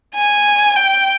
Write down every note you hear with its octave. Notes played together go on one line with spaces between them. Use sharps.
G#5
G5